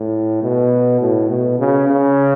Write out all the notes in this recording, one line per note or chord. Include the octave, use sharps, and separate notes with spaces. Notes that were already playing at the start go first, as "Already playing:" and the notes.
Already playing: A2
B2
A2
B2
C#3
C#3